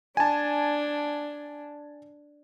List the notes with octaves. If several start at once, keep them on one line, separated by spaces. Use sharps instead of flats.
D4 G#5 A5